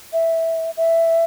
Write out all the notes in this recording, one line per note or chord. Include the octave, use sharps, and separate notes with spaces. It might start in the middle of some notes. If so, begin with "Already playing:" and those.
E5
E5